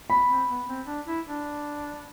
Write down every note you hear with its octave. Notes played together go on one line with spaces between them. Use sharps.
B3 B5
C4
B3
C4
D4
E4
D4